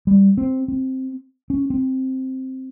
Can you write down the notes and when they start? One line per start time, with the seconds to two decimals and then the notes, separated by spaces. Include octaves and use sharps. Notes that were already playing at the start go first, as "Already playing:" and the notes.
0.07 G3
0.37 C4
0.68 C4
1.50 C#4
1.70 C4